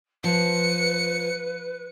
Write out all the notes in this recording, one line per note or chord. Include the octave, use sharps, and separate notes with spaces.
F3 B4 C#7